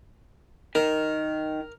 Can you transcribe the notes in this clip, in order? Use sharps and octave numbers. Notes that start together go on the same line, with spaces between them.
D#3 A#4